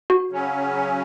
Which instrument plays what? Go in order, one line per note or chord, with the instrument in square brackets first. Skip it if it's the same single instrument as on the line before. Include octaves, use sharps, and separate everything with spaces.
[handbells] F#4
[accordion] C#3 F#3 C#4